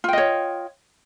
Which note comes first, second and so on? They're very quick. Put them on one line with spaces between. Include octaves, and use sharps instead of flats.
F4 G5 D#5 C#5